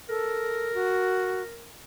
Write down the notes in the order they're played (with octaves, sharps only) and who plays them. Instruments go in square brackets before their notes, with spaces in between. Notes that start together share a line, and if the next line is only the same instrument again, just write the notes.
[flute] A4 [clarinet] A#4
[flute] F#4